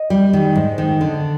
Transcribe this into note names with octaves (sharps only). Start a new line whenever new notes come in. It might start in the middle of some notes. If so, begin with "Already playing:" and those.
Already playing: D#5
G3
D#3
G#2
D#3
D3